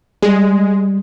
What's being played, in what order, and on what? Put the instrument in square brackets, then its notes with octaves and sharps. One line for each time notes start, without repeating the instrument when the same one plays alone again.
[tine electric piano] G3 [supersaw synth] G#3